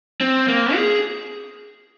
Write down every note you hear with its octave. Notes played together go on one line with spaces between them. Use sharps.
C4
A#3
G#4